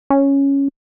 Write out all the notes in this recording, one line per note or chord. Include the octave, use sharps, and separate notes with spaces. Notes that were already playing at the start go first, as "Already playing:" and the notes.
C#4